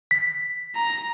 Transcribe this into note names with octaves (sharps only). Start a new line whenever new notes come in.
B6
A#5